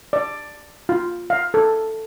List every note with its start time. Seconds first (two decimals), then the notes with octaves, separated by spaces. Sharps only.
0.13 D5
0.89 F4
1.30 F5
1.54 A4